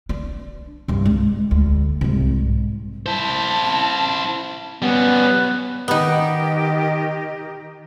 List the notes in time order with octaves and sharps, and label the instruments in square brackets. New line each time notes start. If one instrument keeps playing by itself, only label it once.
[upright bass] D4
C2 G2
G#3
D2
C2 G#2
[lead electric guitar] E4 C5 [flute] A5
[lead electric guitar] G3 C#4 [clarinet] B3 [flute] B4
[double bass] D#3 [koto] B3 D#4 [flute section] G4 D#5